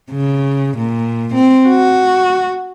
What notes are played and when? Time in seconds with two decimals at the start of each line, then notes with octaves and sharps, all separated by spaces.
0.11 C#3
0.77 A#2
1.35 C4
1.69 F#4